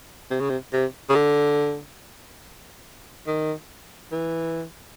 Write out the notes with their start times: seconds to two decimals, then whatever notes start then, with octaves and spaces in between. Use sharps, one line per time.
0.30 C3
0.40 C#3
0.50 C3
0.73 C3
1.09 C#3
1.15 D3
3.27 D#3
4.12 E3